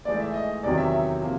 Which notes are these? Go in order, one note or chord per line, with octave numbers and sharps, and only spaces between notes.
G#2 E3 A3 D5
E5
D#5
E2 C3 D#3 F#3 D5
E5
E5
C3 F3 A#3